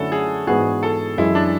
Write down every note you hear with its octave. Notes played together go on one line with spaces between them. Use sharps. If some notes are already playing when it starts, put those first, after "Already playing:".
Already playing: F#2 D3 A3 C#4 E4 F#4 A4
G#4
G#2 E3 B3 D4 F#4 G#4
A4
F#2 E3 G#3 E4
D4